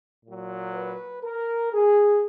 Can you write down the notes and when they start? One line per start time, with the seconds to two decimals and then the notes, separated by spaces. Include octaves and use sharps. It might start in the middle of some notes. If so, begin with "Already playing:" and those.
0.25 A#2 F#3
0.74 B4
1.23 A#4
1.73 G#4